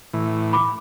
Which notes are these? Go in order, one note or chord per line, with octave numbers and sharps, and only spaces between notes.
A2 E3
B5 D6